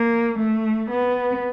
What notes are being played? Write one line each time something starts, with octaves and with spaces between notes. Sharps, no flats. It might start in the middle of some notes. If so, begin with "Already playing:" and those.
Already playing: A#3
A3
B3